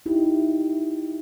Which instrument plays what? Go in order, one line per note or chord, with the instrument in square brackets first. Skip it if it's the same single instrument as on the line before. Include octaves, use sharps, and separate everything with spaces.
[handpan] D#4 E4 G4